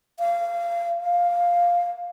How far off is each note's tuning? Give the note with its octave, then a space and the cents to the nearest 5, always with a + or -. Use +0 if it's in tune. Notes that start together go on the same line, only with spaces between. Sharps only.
F5 -25
F5 +5